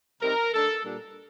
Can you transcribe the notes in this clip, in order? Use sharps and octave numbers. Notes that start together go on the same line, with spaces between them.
C3 G3 C4 D#4 A#4
D#3 A3 D4 A4
A#2 G3 D4